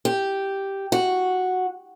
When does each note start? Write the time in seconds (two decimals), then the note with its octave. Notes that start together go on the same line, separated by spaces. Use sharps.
0.05 G4
0.92 F#4